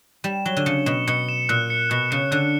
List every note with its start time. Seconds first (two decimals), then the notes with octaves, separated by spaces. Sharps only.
0.24 G3 E7
0.46 F#3 G7
0.57 D3
0.66 C#3 C#7
0.86 B2 E7
1.08 B2 C#7
1.29 E7
1.49 A#2 F#6
1.70 C#7
1.90 B2 F#6
2.11 C#3 C#7
2.31 D3 F#6